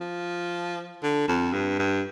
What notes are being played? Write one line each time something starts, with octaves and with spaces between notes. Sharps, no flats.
F3
D3
F2
G2
G2